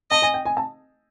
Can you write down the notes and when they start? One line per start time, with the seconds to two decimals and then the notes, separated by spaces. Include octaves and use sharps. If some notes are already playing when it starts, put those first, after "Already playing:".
0.11 D#5 A5
0.22 G#5
0.34 G5
0.45 G#5
0.57 A5